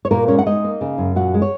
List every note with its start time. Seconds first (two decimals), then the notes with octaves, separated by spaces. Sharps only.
0.05 C#5
0.11 A#2 A#3 A#4
0.28 G#3 C#4 C#5
0.39 F#5
0.46 G#3 D#4 D#5
0.64 A#3
0.81 C#3
0.98 F#2
1.16 A#2 F#4 F#5
1.34 G#3
1.42 C#5